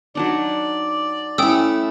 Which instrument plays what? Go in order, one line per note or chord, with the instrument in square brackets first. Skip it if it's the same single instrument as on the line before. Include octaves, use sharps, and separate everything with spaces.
[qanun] F#3 D4 D#4 [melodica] D5
[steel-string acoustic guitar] A3 E4 [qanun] C#4 [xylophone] G5 D#6 E6